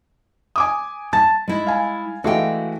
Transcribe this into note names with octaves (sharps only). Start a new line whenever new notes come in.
G#5 D6 D#6
A5 A6
G#3 E4
F5 G#5
E3 G#3 A3 F#4 F5 G5